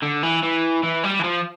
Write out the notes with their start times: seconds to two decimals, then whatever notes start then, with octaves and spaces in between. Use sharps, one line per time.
0.03 D3
0.23 E3
0.43 E3
0.83 E3
1.04 G3
1.19 E3
1.24 F3